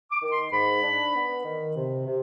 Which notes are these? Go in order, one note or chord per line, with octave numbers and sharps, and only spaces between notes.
D6
D#3
C6
G#2 B5
D4
B3
D#3
C3
C3